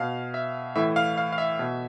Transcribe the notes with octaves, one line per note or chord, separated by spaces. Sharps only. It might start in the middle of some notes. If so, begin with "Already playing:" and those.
Already playing: B2 F5
E5
A2 E3 E5
F5
F5
F5
E5
B2